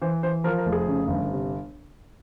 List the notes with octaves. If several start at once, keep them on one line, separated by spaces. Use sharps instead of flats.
E3 C5
E3 C5
F3 A#4
A#4
F1
G#4
C#3
G1
C3